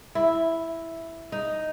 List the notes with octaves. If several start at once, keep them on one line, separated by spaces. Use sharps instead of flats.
E4
D#4